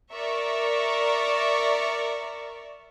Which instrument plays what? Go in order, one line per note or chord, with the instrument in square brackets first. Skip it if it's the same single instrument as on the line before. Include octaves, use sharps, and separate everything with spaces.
[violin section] A#4 D5 E5 C#6